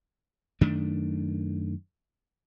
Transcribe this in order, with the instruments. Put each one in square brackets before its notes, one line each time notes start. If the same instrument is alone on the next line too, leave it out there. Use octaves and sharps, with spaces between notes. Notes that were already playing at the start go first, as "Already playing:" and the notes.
[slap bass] F#2 D#3 A3 D4